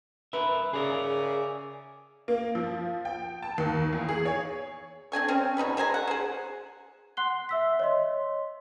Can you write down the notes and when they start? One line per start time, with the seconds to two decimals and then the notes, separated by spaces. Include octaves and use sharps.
0.33 A#4 B4 E5
0.73 C#3 G#4 A#4 D5 E5 G#5
2.28 A#3
2.55 F3
3.05 G5
3.42 A5
3.58 D#2
3.93 E2
4.09 G#4
4.25 C#5
5.12 C4 D4 G#5 C#6
5.28 C4 C#4
5.57 B2 D#4 B5 C#6
5.77 G#3 C5 G#5 A#5
5.94 F#5
6.07 G#4 C5
7.17 F#5 C6 F#6 C7 G7
7.49 E5 E6 B6
7.80 C#5 D#5 C6